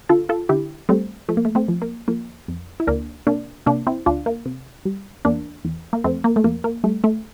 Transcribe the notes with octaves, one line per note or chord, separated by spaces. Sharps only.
D3 F4 A4
F4 A4
D3 E4 G4
G3 A3 C4
F3 A3
A#3
A3
A3 C4
F3
A#3
F3 A#3
F2
E4
D2 A#3 D4
C3 A#3 D4
C3 A#3 D4
C4 E4
D2 D4 F4
A#3
C3
G3
E2 A#3 D4
E2
A#3
F2 A3 C4
A#3
A3
F2 A#3
A#3
G3 A3
A3